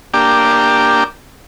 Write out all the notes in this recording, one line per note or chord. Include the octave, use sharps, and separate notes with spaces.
A#3 D4 G4